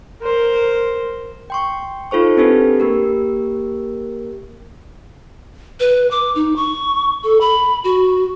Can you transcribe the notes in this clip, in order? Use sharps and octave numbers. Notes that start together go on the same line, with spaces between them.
A#4 C5
G5 C6 C#6
D#4 F4 A4 C5 C#6
C4 D4 G4 A4 B4
A#3 G4 A#4
B4
D6
D#4
C#6
A4
B5
F#4